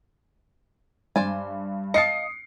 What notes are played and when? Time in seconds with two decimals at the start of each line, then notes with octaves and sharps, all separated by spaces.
1.16 G2 C5 D5 G#5
1.94 D#5 F5 A5 D#6 C7 C#7